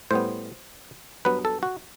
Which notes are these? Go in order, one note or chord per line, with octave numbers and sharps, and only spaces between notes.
A2 G3 B3 C5
G2 F#3 B3 B4
A4
F#4